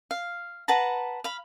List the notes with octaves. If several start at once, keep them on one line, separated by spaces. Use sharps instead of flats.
F5
B4 F#5 A5 A#5
F5 B5